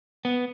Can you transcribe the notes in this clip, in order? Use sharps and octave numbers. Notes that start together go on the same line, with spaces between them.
B3